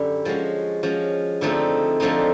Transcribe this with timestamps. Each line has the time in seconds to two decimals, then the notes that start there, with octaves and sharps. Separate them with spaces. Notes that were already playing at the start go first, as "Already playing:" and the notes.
Already playing: F#2 D3 G3
0.25 F3 G#3 C#4 F#4
0.83 F3 G#3 C#4 F#4
1.41 D3 F3 A3 C4 D#4
2.00 D3 F3 A3 C4 D#4